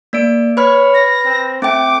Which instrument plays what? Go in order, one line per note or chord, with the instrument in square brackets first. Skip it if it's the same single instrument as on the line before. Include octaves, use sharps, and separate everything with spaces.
[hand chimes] A#3 D5 D7
[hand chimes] B4 B5 F6 [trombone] C#5
[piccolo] A#6
[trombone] C4
[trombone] A3 [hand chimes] C4 G5 [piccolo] D6